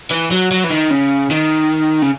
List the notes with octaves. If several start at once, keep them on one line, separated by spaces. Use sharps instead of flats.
E3
F#3
F#3
E3
D#3
C#3
D#3
C#3